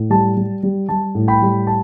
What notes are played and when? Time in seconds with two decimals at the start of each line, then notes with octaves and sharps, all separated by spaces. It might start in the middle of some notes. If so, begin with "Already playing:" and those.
Already playing: A2
0.10 G3 A5
0.37 G3
0.63 G3
0.89 G3 A5
1.15 A2
1.28 G5 B5
1.42 G3
1.67 A5